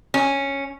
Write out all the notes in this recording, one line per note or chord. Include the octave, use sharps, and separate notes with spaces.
C#4